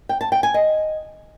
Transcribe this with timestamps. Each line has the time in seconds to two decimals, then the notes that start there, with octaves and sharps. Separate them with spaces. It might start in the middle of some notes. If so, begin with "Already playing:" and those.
0.09 G5
0.21 A5
0.32 G5
0.43 G#5
0.54 D#5